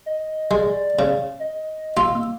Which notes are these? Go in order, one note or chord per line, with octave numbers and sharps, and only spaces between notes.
D#5
G#3 D5
C#3
D#5
F4 E6
A#3